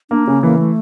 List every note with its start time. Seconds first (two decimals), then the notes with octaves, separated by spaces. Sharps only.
0.11 A#3 D4
0.27 C#3 C#4
0.42 E3 A#3
0.59 A3